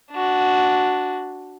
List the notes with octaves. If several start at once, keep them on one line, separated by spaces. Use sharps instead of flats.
D4 F#4